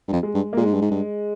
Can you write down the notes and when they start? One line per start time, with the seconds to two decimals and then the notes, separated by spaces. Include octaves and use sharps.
0.08 G2
0.12 F2
0.23 G#3
0.35 G2
0.53 A#3
0.57 A#2 G#3
0.65 G#2
0.74 G2
0.82 G#2
0.91 G2